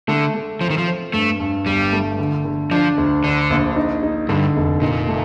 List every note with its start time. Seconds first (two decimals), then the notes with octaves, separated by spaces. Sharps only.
0.08 D3 A3
0.34 A3
0.61 F3 C4
0.70 D#3
0.78 F3
0.87 C4
1.13 G2 A3
1.40 G2
1.66 G1 G3
1.93 A3
2.19 D3
2.45 D3
2.71 F3 D4
2.98 D2
3.24 D3 D4
3.50 A#1
3.76 D#4
4.03 D#4
4.29 G2 D3
4.56 F1
4.82 A#2 D#4
5.09 A3